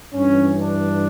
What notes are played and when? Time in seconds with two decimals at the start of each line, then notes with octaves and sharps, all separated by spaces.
0.13 G2 E3 C#4
0.61 D4